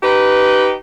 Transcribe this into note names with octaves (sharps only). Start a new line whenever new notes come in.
D#4 G4 B4